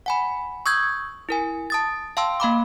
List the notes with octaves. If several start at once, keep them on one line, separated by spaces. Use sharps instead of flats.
F#5 G#5 B5
C#6 D#6 E6 G6 G#6
E4 A#4 G#5
A5 D#6 A6
F5 G5 A5 C6 E6
A#3 F5 B5 D6